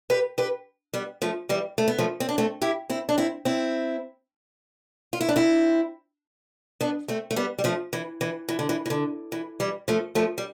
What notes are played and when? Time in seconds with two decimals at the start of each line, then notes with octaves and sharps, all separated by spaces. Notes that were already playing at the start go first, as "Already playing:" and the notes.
0.10 G4 B4
0.38 G4 B4
0.93 G3 B3
1.22 F3 A3
1.49 E3 G3
1.78 A3
1.88 B3
1.99 F3 A3
2.20 C4
2.29 D4
2.38 A3 C4
2.62 E4 G4
2.89 C4 E4
3.09 D4
3.18 C4 E4
3.45 C4 E4
5.13 F4
5.21 E4
5.29 D4
5.36 C4 E4
6.81 B3 D4
7.08 A3 C4
7.31 A3
7.36 G3 B3
7.59 G3
7.64 F3 A3
7.93 E3
8.21 E3
8.49 E3
8.59 D3
8.69 E3
8.86 E3
8.90 D3
9.32 E3
9.60 E3 G3
9.88 F3 A3
10.15 F3 A3
10.38 G3